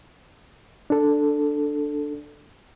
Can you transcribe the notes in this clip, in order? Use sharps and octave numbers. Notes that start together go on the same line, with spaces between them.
D4 A4